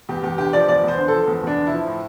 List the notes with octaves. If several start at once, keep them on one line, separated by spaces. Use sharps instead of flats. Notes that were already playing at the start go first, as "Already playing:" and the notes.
E2 G4
E2 G4
D3 G4
F3 D5
E2 D5
E2 C5
D3
F3 A4
E2
E2 D4
D3
E4
F3
A2